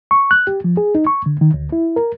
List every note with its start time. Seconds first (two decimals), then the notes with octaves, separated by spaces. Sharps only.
0.11 C#6
0.31 F#6
0.47 G4
0.64 F3
0.77 G#4
0.95 D#4
1.07 C#6
1.26 D3
1.41 D#3
1.54 D2
1.72 E4
1.96 A#4